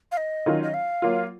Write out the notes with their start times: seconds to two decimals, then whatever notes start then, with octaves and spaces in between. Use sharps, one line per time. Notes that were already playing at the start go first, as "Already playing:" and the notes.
0.12 F5
0.17 D#5
0.46 D#3 F#3 C#4 F4
0.63 D#5
0.74 F5
1.02 F#3 A#3 F4